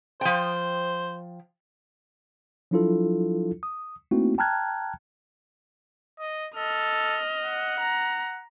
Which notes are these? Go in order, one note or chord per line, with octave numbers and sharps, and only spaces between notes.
F3 C5 G5
F3 F#3 D4 E4 F4 A4
D#6
A3 A#3 C4 D#4 E4 F#4
G5 A5 A#5 F6 F#6 G#6
D#5
A4 D#5 F6
F#5
A#5